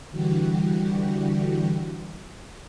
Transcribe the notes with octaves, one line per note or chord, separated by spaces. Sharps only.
D3 E3 G3 F#4 G4